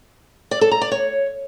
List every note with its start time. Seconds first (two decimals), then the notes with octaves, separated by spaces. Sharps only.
0.51 D5
0.61 A4
0.71 A#5
0.81 D5
0.91 C#5